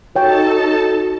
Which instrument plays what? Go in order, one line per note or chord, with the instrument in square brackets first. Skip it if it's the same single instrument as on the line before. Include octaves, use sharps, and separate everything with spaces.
[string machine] D#4 A4 A5 [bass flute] F#4 [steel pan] C#5 G5